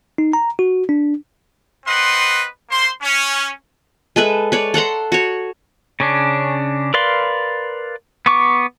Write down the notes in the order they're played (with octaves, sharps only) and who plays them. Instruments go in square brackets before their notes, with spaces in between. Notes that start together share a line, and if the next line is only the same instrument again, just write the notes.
[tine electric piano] D#4
A#5
F#4
D4
[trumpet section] C4 B4 D#5 F#5 C6
A#3 C5 C6
C#4
[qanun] G#3 A4 B4 E5
B4 C#5 D5
A4 F#5 A#5 C6
F#4 C#5
[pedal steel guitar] C#3 C#4 D4
A#4 B4 D5 F5 C6
B3 C#6 D6